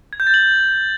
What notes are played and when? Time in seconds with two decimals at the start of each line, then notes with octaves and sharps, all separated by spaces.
0.13 G#6
0.20 G6
0.27 A6
0.34 F#7